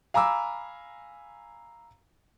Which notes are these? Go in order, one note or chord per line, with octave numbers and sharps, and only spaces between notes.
F5 G#5 A#5 B5 D6 E6